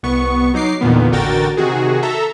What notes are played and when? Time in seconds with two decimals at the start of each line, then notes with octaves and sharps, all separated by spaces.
0.03 C2 B3 C#6
0.54 F#3 D#4 D6 C7
0.81 E2 A#2 D3 D#3 B3
1.11 A1 D3 F#4 A#4 G5 A6
1.57 C3 D#3 F#4 G#4
2.02 A4 E5 A#5